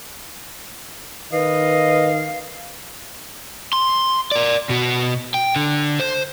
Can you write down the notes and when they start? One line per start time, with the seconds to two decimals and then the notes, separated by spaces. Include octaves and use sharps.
1.32 D#3 B4 D#5 F5
3.73 C6
4.32 A#4 D5
4.69 B2 F#4
5.34 G5
5.56 D3
6.00 C5